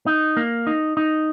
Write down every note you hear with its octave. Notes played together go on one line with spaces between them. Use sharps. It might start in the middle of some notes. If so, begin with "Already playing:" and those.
D#4
A#3
D#4
D#4